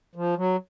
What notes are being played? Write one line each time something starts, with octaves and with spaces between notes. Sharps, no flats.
F3
F#3